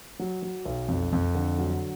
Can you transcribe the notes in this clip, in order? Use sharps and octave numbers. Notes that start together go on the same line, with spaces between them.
F#3
F#3
B1
F2
F2
D3
F#3